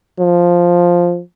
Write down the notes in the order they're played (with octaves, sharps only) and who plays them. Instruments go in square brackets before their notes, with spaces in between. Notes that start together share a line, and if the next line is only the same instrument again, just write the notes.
[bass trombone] F3